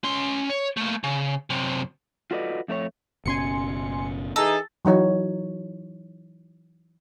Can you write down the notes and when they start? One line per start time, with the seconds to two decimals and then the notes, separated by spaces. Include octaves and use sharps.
0.04 C#4 C6
0.50 C#5
0.77 A3 A#3
1.04 C#3
1.50 F#2 C3
2.31 F4 F#4 A4 B4 D5 D#5
2.68 F2 A3 D4 C#5
3.26 F#1 B2 C#4 G#5 C6 C#7
4.36 E3 D#4 G#4 A4 A#5
4.85 E3 F#3 D#4 C#5